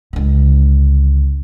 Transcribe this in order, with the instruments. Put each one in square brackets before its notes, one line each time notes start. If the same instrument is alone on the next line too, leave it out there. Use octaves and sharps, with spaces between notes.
[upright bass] C#2 D3